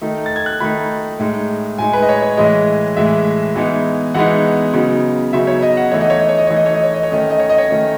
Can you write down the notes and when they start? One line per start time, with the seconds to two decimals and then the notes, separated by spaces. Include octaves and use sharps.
0.02 D#3 A3 D#4
0.26 A6
0.36 G#6
0.46 F#6
0.60 D#3 A3 D#4 B5
1.19 A2 G#3 D#4
1.78 A2 G#3 D#4 G#5
1.93 B4
2.02 D#5
2.09 C#5
2.22 C#5
2.37 A2 E3 G#3 D#5
2.97 A2 E3 G#3 E5
3.56 E3 G#3 B3 D#4
4.14 E3 G#3 B3 D#4 F#5
4.74 C#3 F#3 B3 D#4
5.32 C#3 F#3 B3 D#4 E5
5.47 C#5
5.62 D#5
5.77 F#5
5.91 E3 A3 D#4 C#5
6.01 D#5
6.10 C#5
6.20 D#5
6.29 C#5
6.38 D#5
6.47 E3 A3 D#4 C#5
6.57 D#5
6.66 C#5
6.75 D#5
6.84 C#5
6.94 D#5
7.03 C#5
7.10 D#3 A3 C#4 D#5
7.21 C#5
7.30 D#5
7.39 C#5
7.50 D#5
7.58 C#5
7.69 D#3 A3 C#4